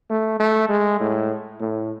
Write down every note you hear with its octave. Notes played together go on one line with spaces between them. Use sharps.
A3
A3
G#3
A2
A2